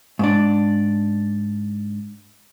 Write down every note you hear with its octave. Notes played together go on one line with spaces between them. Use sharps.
G#2 D4